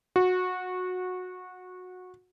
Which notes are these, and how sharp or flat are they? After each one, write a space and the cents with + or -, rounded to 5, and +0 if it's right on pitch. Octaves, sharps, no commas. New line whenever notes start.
F#4 -20